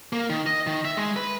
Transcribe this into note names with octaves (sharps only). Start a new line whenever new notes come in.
A#3
D#3
D#5
D#3
E5
G#3
B4